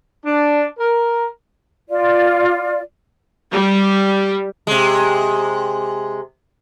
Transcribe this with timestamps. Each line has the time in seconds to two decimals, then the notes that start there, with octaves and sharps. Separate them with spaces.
0.25 D4
0.78 A#4
1.90 F4 D5
3.53 G3
4.67 C3 G#3